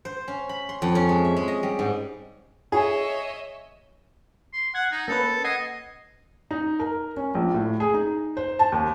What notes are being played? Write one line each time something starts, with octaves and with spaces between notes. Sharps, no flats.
C5
C#4
B5
C6
F2
C#4
G#3
E5
G#3
D#5
G3
G#2
G#4 C#5 D#5 E5
C6
F#5 G#6
D#4
A#3 C#4 A4 B4
D#5 F#5 G#6 C7
D#4
A#4
C#4
A#1
A2
G#4
D#4
C5
A5
D#2